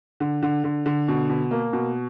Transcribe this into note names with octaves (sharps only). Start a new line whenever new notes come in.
D3
D3
D3
D3
B2
B2
A#3
B2